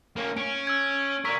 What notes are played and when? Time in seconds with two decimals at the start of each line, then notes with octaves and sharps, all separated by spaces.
0.16 A#3 C#4
0.37 C#4 D7
0.67 E6 G#6
1.25 A#4 D5 C#6 E6 B6